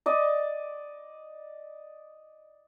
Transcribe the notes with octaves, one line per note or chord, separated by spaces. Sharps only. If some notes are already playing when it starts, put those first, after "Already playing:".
D5 D#5 D6